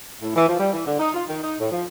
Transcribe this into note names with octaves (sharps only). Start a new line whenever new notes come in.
A2
E3
F3
G3
E3
D3
D#4
F4
D#3
D#4
A2
F3